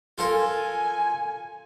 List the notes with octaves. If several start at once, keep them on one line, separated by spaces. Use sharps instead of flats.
F4 A4 A#4 G#5